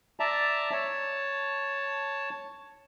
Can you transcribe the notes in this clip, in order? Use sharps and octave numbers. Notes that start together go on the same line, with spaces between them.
D5 E5 A5 A#5
C#5 A5